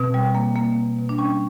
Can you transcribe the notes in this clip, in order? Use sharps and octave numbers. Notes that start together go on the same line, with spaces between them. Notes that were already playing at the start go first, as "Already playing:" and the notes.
Already playing: B2 C4
G3
A#3
A#3
B2
B2
D4
G3 C#4